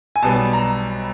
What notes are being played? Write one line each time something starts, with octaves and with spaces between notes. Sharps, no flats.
G#5
B1 B2 G3 B3 A5
A#5